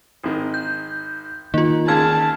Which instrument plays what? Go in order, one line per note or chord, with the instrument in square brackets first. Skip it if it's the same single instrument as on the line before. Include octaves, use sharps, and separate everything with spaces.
[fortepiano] G#1 D#3
[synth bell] G6
[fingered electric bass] D#3 [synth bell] A#3 F4
[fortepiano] C#2 C#3 [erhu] A5 [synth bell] F6 G#6